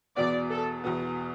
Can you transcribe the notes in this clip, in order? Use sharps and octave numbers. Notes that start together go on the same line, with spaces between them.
E2 B2 B3 D5
A4
E2 B2 B3